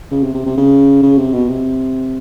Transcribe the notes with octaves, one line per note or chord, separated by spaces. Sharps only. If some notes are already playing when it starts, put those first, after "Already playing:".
C#3
C3
C3
C3
C#3
C#3
C3
B2
C3